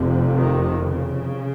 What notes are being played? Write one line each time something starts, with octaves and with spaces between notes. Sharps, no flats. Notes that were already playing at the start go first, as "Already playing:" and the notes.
Already playing: F1 F2 C3
D#3
C#3